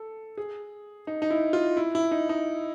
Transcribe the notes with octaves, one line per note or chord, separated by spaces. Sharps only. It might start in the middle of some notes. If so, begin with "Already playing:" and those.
Already playing: A4
G#4
D#4
D#4
E4
F4
E4
E4
D#4
D#4